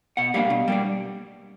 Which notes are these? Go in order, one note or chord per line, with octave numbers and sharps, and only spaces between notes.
B2 F#5
G3 A#3 D4 F5
B2
G3 A#3 D4